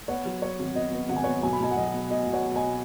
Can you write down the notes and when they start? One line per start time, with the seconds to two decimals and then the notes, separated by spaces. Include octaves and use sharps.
0.08 B3 C#5 F#5
0.25 F#3
0.42 B3 C#5
0.59 G#1
0.75 B3 D#5
0.93 B3
1.09 G#1 F#5
1.16 G#5
1.23 B3 C#5 F#5
1.43 B1 G#5
1.53 B5
1.60 B1 D#5 G#5
1.71 F#5
1.77 B1 D#5
1.94 B2
2.11 B2 D#5
2.27 B1
2.33 C#5 F#5
2.44 B2
2.55 D#5 G#5